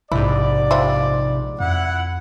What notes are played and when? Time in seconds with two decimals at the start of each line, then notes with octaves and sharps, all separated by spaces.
0.12 A#1 G#2 C3 E4 D5
0.71 F3 G3 E5
1.60 F2 E4 F#5